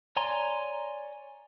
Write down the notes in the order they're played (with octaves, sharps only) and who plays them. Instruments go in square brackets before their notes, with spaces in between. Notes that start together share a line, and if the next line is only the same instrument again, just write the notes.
[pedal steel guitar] C#5 D5 G#5 A#5 C6